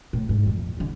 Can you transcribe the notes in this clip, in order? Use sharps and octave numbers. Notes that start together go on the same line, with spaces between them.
A2
G#2
A#1 F2
E2 D3